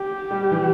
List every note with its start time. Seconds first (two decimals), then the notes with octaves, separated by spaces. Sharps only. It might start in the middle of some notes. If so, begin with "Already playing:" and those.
Already playing: G4
0.30 G3
0.51 E3